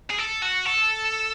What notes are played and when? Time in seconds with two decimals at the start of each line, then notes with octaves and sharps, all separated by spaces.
0.10 G#4
0.18 A4
0.42 F#4
0.65 A4